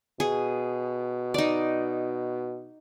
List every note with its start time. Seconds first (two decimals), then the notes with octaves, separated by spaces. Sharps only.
0.20 B2 G#4
1.34 D#4 D5